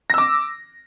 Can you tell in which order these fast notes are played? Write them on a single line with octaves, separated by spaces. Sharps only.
A#6 E6 D6